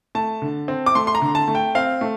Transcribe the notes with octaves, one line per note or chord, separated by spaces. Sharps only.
A3 A5
D3
C4
D6
A3 C6
C6
A#5
D3
A5
A3
G5
C4 F5
A3